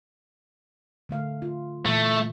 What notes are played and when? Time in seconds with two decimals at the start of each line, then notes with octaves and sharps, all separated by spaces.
1.09 D3 A3 F5
1.42 F4
1.85 A#2 E3 A3